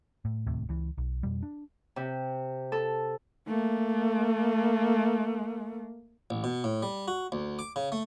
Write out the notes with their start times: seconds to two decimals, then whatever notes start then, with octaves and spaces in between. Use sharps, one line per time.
0.25 A2
0.47 D1 D#2 A2 C3
0.69 C#2 E3
0.98 B1
1.23 F2 B2 G3
1.43 D4
1.96 C3
2.72 A4
3.48 A3 A#3
6.30 A1
6.44 B2
6.64 A2
6.83 G3
7.08 F#4
7.32 D2
7.59 D6
7.76 C#3
7.92 A3